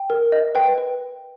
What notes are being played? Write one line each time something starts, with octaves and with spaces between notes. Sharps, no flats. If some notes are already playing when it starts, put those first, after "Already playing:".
Already playing: G5
A#4
D#5
B4 G5
B4